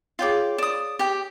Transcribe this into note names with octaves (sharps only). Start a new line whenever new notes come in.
F4 G#4 C#5 F5 G5 D6
D5 D#6 E7
G4 G5